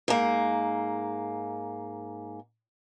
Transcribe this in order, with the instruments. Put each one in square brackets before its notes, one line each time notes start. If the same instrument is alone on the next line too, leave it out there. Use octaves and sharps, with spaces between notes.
[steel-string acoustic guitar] G#2 A#3